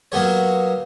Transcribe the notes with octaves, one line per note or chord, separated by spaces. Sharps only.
F#3 A#3 B3 G4 C#5